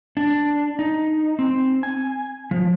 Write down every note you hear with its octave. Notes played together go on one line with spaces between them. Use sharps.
D4
D#4
C4
G#5
F3